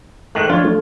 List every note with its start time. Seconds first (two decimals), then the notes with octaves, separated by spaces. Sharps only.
0.35 G#2 D#3 A3 F#6
0.50 F3 D4 F4 C#5
0.65 A3